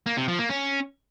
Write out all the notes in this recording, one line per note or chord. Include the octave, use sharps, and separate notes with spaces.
A#3
C3
F3
A#3
C#4